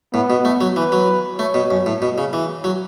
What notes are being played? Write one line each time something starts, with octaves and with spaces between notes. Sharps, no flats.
A2 B3
B2
A3
F#3
E3 B4
F#3
A3 C#5
B2
F#2
A2
B2
C#3
E3
F#3